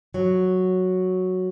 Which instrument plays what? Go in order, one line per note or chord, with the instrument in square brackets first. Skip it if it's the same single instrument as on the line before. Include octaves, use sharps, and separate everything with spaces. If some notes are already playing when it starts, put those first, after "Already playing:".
[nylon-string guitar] F#3